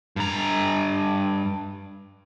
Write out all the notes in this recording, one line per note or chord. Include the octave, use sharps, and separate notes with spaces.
G2 A#5